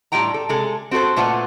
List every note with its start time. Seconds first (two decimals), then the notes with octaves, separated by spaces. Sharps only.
0.12 A2 G3 C4 F4 G5 A#5
0.34 A4
0.49 C3 G#3 G#4 A4
0.91 C4 F#4 G#4 A4 C5
1.16 A#2 A3 F4 B4 F#5